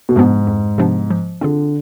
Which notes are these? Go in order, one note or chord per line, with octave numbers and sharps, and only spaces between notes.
B2
G#2 C3 F3 B3 D4
F2
C3 F3 B3 D4
F3
D3 C4 F4 G#4